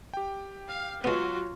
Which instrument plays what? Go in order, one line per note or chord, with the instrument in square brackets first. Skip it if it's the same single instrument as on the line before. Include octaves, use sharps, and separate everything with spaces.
[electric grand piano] G4 G5
[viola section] F5
[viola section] F#3 F#4 [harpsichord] G#3 B3 [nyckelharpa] F4